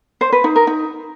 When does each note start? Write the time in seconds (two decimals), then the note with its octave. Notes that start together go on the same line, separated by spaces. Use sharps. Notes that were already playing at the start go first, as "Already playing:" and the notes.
0.21 C5
0.33 B4
0.44 D#4
0.56 A#4
0.67 D#4